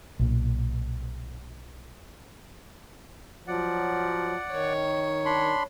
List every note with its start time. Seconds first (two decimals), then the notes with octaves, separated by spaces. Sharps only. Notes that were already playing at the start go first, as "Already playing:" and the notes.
0.19 B1 A#2
3.47 F3 F#3 D5 F#5
4.51 D#3 C#5
5.25 D4 B5 C6